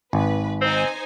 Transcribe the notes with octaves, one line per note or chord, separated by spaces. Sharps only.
G#1 B4
C4 D#4 C5 G#5